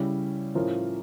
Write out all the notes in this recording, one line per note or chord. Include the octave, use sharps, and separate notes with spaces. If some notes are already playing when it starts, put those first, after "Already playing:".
Already playing: C#3 G3 C#4 E4
A2 F3 C#4 F4 A#4